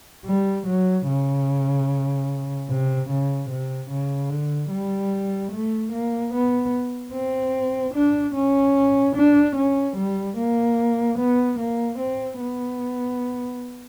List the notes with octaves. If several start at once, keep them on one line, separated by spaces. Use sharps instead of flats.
G3
F#3
C#3
C3
C#3
C3
C#3
D3
G3
A3
A#3
B3
C4
D4
C#4
D4
C#4
G3
A#3
B3
A#3
C4
B3